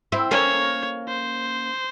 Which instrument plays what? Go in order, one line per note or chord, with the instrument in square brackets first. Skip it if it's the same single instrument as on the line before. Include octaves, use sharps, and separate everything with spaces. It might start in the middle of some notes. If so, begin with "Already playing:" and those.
[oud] C4 E4
[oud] A#3 C#4 [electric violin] C#5
[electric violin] C5